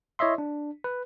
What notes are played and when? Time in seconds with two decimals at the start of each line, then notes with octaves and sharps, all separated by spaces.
0.19 E4 C#5 D#5 E5 C6
0.38 D4
0.84 B4